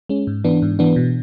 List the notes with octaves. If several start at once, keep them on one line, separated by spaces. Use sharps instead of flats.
G#3 C#4
G#2
E3 B3 D4
G#2
E3 B3 D4
B2